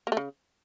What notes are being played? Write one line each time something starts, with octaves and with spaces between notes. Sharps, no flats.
A#3
A3
C#3